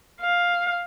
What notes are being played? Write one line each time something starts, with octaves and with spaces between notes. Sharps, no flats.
F5